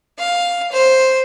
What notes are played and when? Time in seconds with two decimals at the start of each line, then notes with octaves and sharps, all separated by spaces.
0.19 F5
0.72 C5